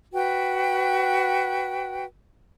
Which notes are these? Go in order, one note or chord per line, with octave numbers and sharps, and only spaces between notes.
F#4 B4 G5